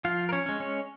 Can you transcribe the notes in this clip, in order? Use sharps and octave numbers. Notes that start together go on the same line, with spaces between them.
F3 F4 F5
A#4
C#4 C#5
G#3 C#4
C#4 C#5